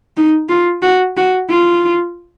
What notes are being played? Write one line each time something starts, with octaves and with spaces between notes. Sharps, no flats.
D#4
F4
F#4
F#4
F4